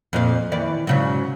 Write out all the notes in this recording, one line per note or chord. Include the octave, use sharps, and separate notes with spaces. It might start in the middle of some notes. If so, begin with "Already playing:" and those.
F2 A#2 F5
D#3 E3 D5
G#2 C#3 F#3